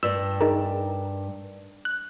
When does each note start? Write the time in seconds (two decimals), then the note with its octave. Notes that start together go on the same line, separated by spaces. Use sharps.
0.03 G2 E6
0.41 D#4 G#4 A#4
1.85 F#6